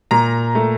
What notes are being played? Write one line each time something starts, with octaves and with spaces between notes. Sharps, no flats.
A#2 A#5
A3